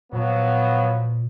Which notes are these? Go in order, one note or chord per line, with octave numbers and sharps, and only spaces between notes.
A#2 F3 F#3 B3